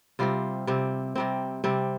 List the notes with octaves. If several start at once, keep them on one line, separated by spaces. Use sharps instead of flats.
C3 G3 C4 F4
C3 G3 C4
C3 G3 C4
C3 G3 C4